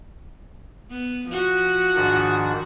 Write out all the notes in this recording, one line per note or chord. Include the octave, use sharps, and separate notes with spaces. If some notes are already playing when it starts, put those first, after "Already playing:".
B3
F3 F#4
G#2 D#3 D4